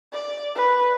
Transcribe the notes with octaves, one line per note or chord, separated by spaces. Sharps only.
D5
B4